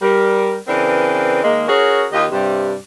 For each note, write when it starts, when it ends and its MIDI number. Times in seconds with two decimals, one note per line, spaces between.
0.02 0.58 55
0.02 0.58 70
0.68 1.43 49
0.68 1.43 52
0.68 1.43 60
0.68 1.43 62
0.68 1.43 70
0.68 1.43 71
1.44 1.64 51
1.44 1.64 56
1.44 1.64 58
1.68 2.07 61
1.68 2.07 66
1.68 2.07 68
1.68 2.07 70
1.68 2.07 73
2.12 2.25 39
2.12 2.25 65
2.12 2.25 67
2.12 2.25 75
2.31 2.75 43
2.31 2.75 48
2.31 2.75 55